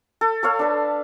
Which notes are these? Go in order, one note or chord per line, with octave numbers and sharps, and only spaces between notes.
A4
A4 C#5 F5
D4 B4